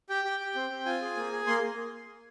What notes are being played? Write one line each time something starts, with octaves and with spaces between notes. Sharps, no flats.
G4 G5
G4
G4
C4
C4
F4 G#5
G#4
A#3
G#4
A#3 C6